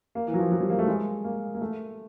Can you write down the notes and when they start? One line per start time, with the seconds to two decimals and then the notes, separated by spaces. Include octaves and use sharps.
0.15 A#3
0.27 E3
0.34 F#3
0.39 F3
0.52 F#3
0.61 G3
0.70 A#3
0.79 A3
0.88 G#3
1.24 A#3
1.54 A#3
1.61 A3